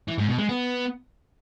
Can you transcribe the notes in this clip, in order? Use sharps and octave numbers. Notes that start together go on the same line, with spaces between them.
E3
G#2
B2
G#3
B3